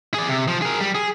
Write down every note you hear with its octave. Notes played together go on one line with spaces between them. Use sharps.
G#4 D5
C3
F3
G#4 A#4
G3
G#4